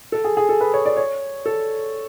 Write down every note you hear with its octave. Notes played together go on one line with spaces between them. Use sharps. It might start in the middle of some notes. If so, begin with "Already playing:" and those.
A4
G#4
G#4
A4
B4
C#5
D5
C#5
A4